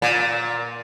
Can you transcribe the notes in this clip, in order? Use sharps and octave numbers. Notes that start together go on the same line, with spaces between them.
A#2